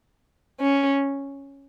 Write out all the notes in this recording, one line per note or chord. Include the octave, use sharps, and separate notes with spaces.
C#4